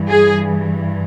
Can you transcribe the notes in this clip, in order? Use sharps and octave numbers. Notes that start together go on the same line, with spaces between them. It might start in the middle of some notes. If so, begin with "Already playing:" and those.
Already playing: G2 E3
G#4